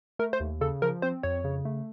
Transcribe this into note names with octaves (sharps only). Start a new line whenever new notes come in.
A3 A#4
C5
D#2
C#3 A4
F3 A#4
C4 C5
F2 C#5
C#3
A3